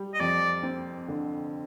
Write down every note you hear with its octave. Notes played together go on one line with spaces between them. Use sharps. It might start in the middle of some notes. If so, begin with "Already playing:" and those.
Already playing: G3
D#5
F2 D5
C4
D3